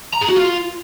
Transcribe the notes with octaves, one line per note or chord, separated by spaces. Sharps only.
A#5
G#4
F#4
F4